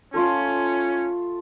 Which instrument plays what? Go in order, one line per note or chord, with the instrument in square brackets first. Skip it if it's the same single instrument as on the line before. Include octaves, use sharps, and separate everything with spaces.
[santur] A3 F4 A4 [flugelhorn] C#4